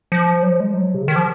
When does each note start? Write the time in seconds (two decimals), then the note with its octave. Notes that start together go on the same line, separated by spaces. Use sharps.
0.12 F3
0.43 F#3
0.49 F3
0.60 G#3
0.74 F#3
0.94 C3
1.01 C#3
1.08 D#3
1.16 F3